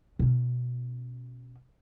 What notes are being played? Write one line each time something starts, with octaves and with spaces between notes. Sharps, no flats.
B2 C#4